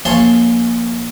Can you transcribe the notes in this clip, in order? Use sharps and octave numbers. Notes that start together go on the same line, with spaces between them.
A#1 C#4 C#5 G#5 A5 C6